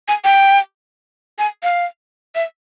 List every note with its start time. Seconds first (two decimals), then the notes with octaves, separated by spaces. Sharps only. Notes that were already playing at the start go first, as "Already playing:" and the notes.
0.08 G#5
0.24 G5
1.39 G#5
1.63 F5
2.35 E5